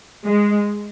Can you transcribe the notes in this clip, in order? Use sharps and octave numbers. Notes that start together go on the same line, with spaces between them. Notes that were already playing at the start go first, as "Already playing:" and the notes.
G#3